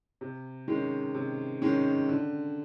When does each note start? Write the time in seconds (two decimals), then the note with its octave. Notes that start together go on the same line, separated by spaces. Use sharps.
0.21 C3
0.68 D#3 G#3 C#4
1.14 C3
1.62 D#3 G#3 C#4
2.09 D3